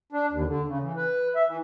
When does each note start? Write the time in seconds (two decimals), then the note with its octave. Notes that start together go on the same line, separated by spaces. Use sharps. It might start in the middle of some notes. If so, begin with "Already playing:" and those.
0.12 D4
0.32 D#2
0.47 D3
0.68 C#3
0.82 E3
0.97 B4
1.36 E5
1.48 E3